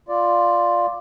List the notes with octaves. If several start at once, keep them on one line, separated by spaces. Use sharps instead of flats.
F4 D5